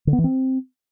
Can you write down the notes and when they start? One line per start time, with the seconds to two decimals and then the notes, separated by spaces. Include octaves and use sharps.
0.07 D3
0.13 B3
0.18 E3
0.24 C4